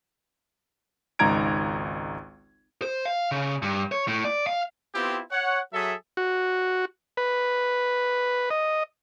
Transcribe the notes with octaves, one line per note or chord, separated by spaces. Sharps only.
G#1 C#2 D#4 A#5 G#6 D7
C5
F5
C#3
G2
C#5
A2
D5
F5
B3 C4 E4 F4 G4
C#5 F#5
F#3 G#4 A4 E5
F#4
B4
D#5